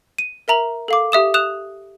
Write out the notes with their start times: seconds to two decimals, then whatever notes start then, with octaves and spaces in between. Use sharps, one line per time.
0.18 D#7
0.48 A#4 E5 A#5 F#7
0.88 A4 F5 D6
1.12 G4 E5 D#6 E7
1.34 D#6 F#6 E7 F7